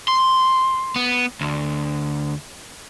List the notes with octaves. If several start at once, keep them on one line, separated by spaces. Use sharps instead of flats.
C6
B3
D2